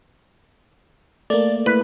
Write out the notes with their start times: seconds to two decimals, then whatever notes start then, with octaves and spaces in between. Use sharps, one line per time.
1.30 A3 A#3 D5 A6
1.66 E4 B4